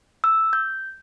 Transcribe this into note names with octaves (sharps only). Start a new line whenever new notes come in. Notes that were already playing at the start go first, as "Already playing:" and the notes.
E6
G6